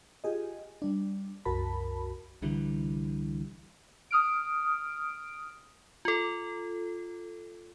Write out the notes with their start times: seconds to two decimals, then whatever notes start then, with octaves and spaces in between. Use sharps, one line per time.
0.24 F4 G4 G#4 D#5
0.82 G3 D4
1.45 C2 F#2 F#4 A#4 A5 B5
2.42 C2 D3 E3 G3
4.11 D#6 F6 D7
6.05 F4 A4